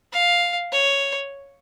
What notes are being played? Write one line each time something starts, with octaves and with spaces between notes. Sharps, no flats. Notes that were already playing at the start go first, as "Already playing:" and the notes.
F5
C#5